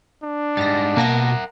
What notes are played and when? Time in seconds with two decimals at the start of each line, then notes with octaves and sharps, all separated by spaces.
0.23 D4
0.57 G#2 G3 A6 A#6
0.97 B2 A#3 A#4 F#5 A5 A#6